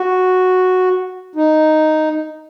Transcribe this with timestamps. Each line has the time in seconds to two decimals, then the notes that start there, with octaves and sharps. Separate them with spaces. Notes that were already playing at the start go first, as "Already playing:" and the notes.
Already playing: F#4
1.36 D#4